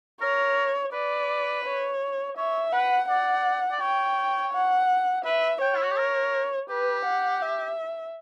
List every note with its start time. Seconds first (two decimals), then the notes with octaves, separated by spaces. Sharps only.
0.21 A#4 C#5
0.93 B4 D5
1.65 C#5
2.37 C#5 E5
2.73 B4 F#5
3.09 D5 F#5
3.72 D5
3.81 C#5 G5
4.54 F#5
5.25 B4 E5
5.61 C#5 G5
5.76 E4
5.82 F#4
5.91 G4
5.97 A#4
6.69 G4 B4
7.06 F#5
7.41 E5